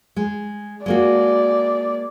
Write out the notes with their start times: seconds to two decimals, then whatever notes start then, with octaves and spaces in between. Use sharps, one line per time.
0.16 G#3
0.86 G#3 A#3 F#4 D5